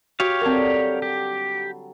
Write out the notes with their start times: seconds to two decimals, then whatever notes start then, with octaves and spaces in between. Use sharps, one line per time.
0.20 F#4 G4 C#5 F5
0.41 D3 F#3 G3 C4 A#4
1.02 G4